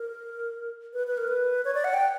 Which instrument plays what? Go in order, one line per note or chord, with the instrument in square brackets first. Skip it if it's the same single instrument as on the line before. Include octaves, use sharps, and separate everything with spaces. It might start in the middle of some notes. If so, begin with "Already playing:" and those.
Already playing: [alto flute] A#4
B4
B4
A#4
B4
C#5
D5
F#5
G5